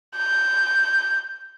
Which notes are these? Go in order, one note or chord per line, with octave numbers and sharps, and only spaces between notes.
G6